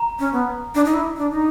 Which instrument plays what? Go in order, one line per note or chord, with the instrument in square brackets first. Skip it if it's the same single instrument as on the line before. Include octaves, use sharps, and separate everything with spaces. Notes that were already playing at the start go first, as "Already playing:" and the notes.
Already playing: [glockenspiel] A#5
[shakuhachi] C#4
B3
D4
D#4
E4
D4
D#4